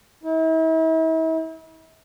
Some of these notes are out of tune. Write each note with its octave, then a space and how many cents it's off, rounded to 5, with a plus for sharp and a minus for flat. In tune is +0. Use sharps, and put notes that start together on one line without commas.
E4 -40